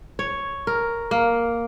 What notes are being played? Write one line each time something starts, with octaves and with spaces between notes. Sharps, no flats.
C#5
A#4
A#3